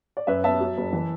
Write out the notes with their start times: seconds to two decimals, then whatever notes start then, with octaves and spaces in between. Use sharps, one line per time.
0.17 D5
0.27 F#2 B4 E5
0.44 B3 E5 A5
0.61 F#3
0.77 F#1
0.93 E3